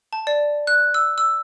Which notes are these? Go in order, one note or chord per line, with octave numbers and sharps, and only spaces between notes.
A5
D5
F#6
E6
E6